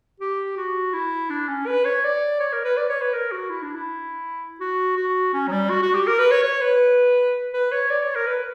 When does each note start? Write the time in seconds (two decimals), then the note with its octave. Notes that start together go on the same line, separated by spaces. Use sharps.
0.20 G4
0.57 F#4
0.93 E4
1.30 D4
1.49 C#4
1.67 B4
1.85 C#5
2.04 D5
2.40 C#5
2.53 A#4
2.65 B4
2.77 D5
2.89 C#5
3.02 B4
3.13 A#4
3.32 F#4
3.50 E4
3.62 D4
3.75 E4
4.60 F#4
4.97 F#4
5.33 C#4
5.48 F#3
5.52 G3
5.70 F#4
5.82 F#4
5.95 G4
6.07 A#4
6.19 B4
6.31 C#5
6.43 C#5
6.62 B4
7.53 B4
7.72 C#5
7.90 D5
8.03 C#5
8.15 A#4
8.27 B4